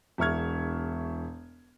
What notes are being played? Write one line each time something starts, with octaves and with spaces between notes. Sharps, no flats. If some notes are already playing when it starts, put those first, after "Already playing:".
E1 E5 C#6 F6 G#6